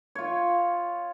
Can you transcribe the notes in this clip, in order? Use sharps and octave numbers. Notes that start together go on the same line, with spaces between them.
F4 C#5